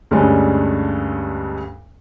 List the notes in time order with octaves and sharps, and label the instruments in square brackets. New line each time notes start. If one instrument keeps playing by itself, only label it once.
[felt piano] D2 G2 G3 G#3 C#4 D4